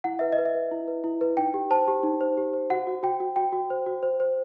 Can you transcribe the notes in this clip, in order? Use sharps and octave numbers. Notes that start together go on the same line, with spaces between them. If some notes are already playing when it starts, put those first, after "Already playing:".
E4 F#5
B4 E5
D#5
B4
E5
B4
E4
B4
E4
B4
D#4 G5
G4
C5 A5
G4
D#4
C5
G4
C5
F#4 F#5
F#4
F#4 G5
F#4
F#4 G5
F#4
C5
F#4
C5
C5